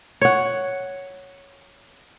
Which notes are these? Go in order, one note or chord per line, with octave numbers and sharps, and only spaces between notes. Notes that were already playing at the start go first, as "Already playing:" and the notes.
C#5 F#5